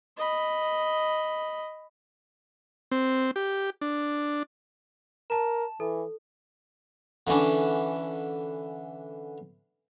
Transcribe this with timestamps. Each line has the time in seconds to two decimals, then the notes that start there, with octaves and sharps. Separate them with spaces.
0.17 D#5 B5
2.91 C4
3.36 G4
3.81 D4
5.30 A#4 A5 E7
5.80 E3 A4
7.27 D3 E3 C#4 D4